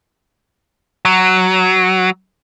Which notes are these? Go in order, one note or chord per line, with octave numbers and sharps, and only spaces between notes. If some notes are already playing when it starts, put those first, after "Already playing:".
F#3